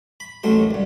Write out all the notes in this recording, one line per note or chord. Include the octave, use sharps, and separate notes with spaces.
B5
A1 D#2 A2 F#3 A3 C6
C#2 G2